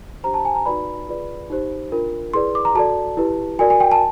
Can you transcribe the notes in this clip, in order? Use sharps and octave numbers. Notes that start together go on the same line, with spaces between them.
D4 G4 C5 A#5
A5
G#5
A#5
D#4 F#4 B4 D5 B5
F4 G#4 B4 D5
D#4 G4 C5
D4 F4 A#4
E4 G#4 B4 D5 C6
D6
A#5
F#4 A4 D5 A5
E4 G4 B4
F#4 A#4 D5 G#5
G#5
G5
A5